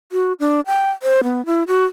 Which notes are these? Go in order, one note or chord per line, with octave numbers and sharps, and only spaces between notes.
F#4
D4
G5
C5
B3
E4
F#4